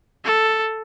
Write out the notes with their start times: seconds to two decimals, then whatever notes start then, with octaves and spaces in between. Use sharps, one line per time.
0.25 A4